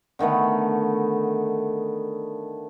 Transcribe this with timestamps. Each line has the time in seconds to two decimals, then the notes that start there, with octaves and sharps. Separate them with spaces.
0.19 D3 D#3 A3 B3